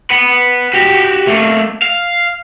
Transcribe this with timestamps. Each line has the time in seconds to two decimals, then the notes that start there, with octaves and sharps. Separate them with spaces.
0.10 B4 F#5
0.74 F#4 G4
1.27 A3 A#3
1.82 F5